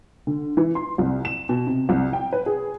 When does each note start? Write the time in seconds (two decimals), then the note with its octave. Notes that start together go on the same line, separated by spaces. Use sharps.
0.27 D3
0.57 E3
0.75 C6
0.98 C2
1.25 E7
1.49 B2
1.67 C3
1.89 C2
2.13 G5
2.33 B4
2.46 G#4